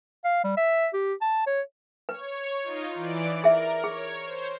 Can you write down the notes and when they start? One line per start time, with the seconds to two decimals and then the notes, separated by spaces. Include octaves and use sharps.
0.24 F5
0.44 G3
0.57 E5
0.93 G4
1.21 A5
1.47 C#5
2.09 B4 C#5
2.63 D#4 F4
2.95 E3 D5 D7
3.44 G#4 A#4 E5
3.84 G#4 C#5
4.25 C5